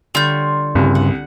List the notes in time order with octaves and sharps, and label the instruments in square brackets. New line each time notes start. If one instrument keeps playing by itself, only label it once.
[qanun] D3 G3 C#5 [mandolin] F4 G6
[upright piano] C2 [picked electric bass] G2 C#3
[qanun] F#5